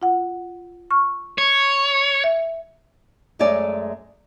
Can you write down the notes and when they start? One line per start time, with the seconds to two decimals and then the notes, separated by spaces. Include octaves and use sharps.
0.02 F4 F#5
0.91 C#6 F6
1.38 C#5 C#6
2.24 E5
3.39 F#2 G#3 A3 C#5 D5 G#5